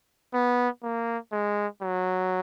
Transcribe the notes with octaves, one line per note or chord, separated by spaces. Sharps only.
B3
A#3
G#3
F#3